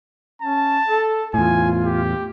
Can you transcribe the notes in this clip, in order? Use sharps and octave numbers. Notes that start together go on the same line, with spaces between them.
C#4 A5
A4
E2 A2 F4 G#5
G4